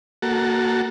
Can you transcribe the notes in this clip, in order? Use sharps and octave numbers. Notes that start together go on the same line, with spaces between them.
A#3 F#4 A4